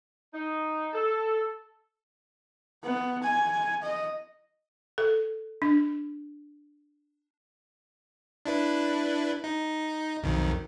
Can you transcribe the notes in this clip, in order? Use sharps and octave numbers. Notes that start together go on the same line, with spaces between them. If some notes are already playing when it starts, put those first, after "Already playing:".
D#4
A4
B3
G#5
D#5
A4
D4
D4 E4 B4
D#4
B1 F2 D#3